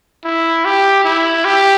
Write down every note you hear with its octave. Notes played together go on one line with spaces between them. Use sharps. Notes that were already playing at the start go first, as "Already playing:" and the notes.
E4
G4
E4
G4